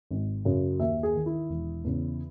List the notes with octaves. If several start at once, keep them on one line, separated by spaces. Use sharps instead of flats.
G#1
F#2 C#3
D#2 E5
G#4
D#3
E4
E1
E2 C#3